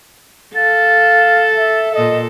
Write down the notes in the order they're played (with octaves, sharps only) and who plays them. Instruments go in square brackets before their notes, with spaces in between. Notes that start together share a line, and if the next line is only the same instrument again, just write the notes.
[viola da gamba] A4 [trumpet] F5 [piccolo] A6
[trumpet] E5
[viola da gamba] A#2 A4 [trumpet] D#5